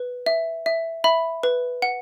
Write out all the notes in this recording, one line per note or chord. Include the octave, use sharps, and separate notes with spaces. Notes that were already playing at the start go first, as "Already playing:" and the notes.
Already playing: B4
E5
E5
E5 B5
B4
F#5